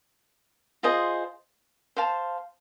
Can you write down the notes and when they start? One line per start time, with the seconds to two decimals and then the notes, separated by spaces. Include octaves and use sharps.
0.83 F4 G#4 C5 D#5
1.96 C5 F5 A5